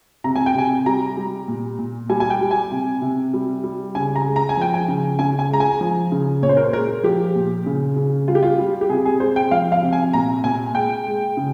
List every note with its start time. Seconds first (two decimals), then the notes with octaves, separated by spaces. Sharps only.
0.24 C3 A#5
0.36 G#5
0.46 G5
0.55 C3 G#5
0.86 G3 A#5
1.17 G3
1.48 A#2
1.79 A#2
2.09 G3 G#5
2.20 G#5
2.30 G5
2.41 G3
2.51 G#5
2.71 C3
3.02 C3
3.34 G3
3.64 G3
3.95 C#3 G#5
4.16 A#5
4.25 G#3
4.36 A#5
4.49 G#5
4.57 F3 G5
4.74 G#5
4.88 C#3
5.19 C#3 G#5
5.39 G#5
5.50 G#3 A#5
5.60 G#5
5.81 F3
6.12 C#3
6.42 A#2 C#5
6.49 C5
6.57 A#4
6.64 C5
6.73 G#3 A#4
7.04 F3 G4
7.35 A#2
7.66 C#3
7.96 C#3
8.28 G3 F4
8.35 G4
8.43 F4
8.59 G3
8.81 G4
8.90 C3 G#4
9.05 G#4
9.20 G#3 C5
9.36 G5
9.51 F3 F5
9.72 F5
9.82 C3
9.93 G#5
10.13 A#2 A#5
10.44 A#2 G#5
10.75 G#3 G5
11.06 G#3
11.37 C#3